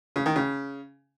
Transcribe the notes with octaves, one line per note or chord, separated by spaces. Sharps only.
C#3
D#3
C#3